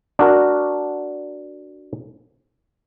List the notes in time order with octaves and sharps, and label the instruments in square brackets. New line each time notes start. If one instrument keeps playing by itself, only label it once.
[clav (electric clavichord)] D4 F#4 A#4